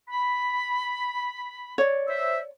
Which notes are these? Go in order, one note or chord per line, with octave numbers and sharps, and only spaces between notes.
B5
C#5 D5
C5 E5